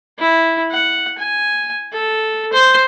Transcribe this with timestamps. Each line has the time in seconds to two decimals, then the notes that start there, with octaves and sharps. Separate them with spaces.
0.19 E4
0.72 F#5
1.18 G#5
1.92 A4
2.53 C5